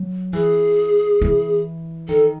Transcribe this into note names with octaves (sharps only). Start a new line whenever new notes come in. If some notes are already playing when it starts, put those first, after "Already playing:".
Already playing: F#3
E3 G#4
E3
D#3 A4